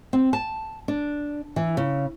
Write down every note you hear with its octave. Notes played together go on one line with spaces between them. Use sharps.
C4
A5
D4
E3
C#3